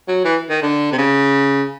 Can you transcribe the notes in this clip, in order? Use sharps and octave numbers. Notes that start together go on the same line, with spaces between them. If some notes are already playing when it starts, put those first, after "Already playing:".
F#3
E3
D#3
D3
C3
C#3